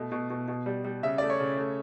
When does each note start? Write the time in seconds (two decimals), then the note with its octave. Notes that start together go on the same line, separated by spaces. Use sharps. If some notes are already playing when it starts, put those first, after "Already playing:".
Already playing: B2 A3
0.11 B2
0.30 B2
0.48 B2
0.66 G3
0.84 G3
1.03 C#3 E5
1.18 A3 D5
1.30 C#5
1.40 C#3
1.57 A3